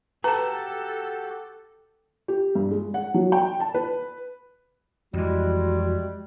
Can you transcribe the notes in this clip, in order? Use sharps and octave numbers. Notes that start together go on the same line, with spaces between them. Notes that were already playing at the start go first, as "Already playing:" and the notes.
F#4 G4 A4 B4 A5 A#5
G4
G2
G#3
F#5
F#3
G5
A5
B4
F2 E3 G3 G#3 F#4